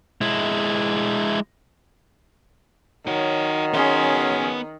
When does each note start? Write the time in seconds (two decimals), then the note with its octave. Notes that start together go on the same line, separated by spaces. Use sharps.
0.21 G#3 E4
3.07 D#3 F#3 D#4 C#5
3.73 B3 C#4 G#4 C6